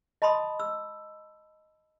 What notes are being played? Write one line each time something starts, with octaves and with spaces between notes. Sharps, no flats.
D#5 A5 B5 C6 D#6
E6